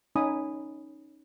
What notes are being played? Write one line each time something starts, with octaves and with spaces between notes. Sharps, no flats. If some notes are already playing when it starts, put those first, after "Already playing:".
C#4 D#4 G#5 B5 D#6